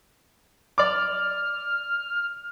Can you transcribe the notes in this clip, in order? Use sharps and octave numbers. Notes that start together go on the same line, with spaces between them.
D5 D6 F6